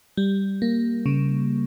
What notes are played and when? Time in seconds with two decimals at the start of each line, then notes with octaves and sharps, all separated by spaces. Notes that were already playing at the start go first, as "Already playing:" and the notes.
0.17 G3
0.62 A#3
1.06 C#3